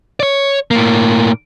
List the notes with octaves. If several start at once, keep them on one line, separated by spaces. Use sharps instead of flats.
C#5 D5
A2 A#3